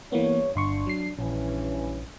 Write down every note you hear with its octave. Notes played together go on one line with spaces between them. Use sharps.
G2 E3 A#3 B3 C#5
G1 D4 C6 C#6
F#3 C7
A#1 G2 E3 C#4